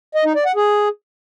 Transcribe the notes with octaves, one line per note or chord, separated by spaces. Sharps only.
D#5
D#4
D5
F#5
G#4